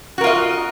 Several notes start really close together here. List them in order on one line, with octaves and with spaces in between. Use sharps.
F#4 A#4 F4 D#5